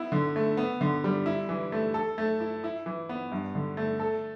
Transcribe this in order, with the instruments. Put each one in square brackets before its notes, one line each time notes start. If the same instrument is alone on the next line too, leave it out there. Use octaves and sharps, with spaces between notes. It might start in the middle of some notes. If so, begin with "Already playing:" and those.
Already playing: [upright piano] B3 E4
D3
A3
B3
D3
G3
E4
E3
A3
A4
A3
E4
E4
E3
B3
G2
D3
A3
A4